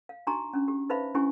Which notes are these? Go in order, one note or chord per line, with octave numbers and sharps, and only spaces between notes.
F5
D4 D#4 F#4 G#5 A#5 C#6
C#4 D4
G4
D#4 B4 C5 E5 F5 B5
C#4 D4 E4 G4 G#5 C#6